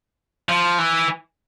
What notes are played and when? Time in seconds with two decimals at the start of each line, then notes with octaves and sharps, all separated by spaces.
0.49 F3
0.78 E3